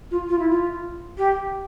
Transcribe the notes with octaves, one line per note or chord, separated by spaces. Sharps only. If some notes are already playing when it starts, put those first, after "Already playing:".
F4
F4
E4
F4
G4